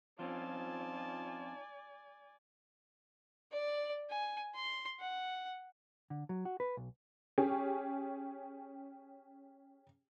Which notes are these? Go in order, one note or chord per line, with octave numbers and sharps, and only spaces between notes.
F3 C4 C#4 D#4 F4 D5 G#5 A5
D5
G#5
C6
F#5
D3
F#3
F#4
B4
B1
C#4 G4 G#4